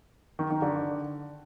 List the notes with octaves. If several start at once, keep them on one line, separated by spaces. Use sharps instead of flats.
D#3
D#3
D3